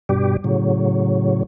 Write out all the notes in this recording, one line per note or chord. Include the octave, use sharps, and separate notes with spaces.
G2 B2 G3 G4
A2 C#3 F#3